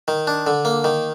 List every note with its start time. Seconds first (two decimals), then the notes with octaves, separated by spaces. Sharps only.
0.08 D#3
0.27 D4
0.47 D3
0.65 A#3
0.84 D#3